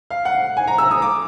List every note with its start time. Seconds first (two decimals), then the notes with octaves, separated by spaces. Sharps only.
0.10 F5
0.25 F#5
0.57 G#5
0.67 A#5
0.78 E6
0.91 D#6
1.02 D6